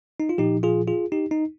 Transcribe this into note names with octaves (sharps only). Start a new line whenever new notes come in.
D#4
F4
A#2 F3 D#4 G4
F4 G#4
F4 G#4
D#4 G4
D#4